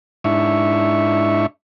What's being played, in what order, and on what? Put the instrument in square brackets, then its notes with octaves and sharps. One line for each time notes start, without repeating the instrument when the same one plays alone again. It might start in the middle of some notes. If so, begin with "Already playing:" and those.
[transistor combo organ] G#2 D4 E4 E5 C#6